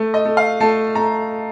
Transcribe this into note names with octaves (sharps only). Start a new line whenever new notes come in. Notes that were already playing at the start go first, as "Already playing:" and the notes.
Already playing: A3
D#5
A3
F5
A3 A5
A3 A#5